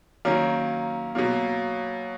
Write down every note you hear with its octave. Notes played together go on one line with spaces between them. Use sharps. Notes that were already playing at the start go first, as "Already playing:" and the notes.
D#3 F#3 A#3 C#4
B2 F#3 A#3